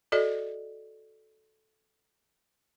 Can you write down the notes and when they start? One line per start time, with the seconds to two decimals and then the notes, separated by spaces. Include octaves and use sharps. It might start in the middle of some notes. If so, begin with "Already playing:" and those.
0.12 F#4 A4 D5 D#5